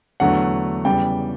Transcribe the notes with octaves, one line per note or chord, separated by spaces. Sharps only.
E2 D3 F#3 A3 F#5
E2 C#3 G3 G5